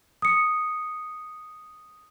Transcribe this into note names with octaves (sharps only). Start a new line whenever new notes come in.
D#6 C#7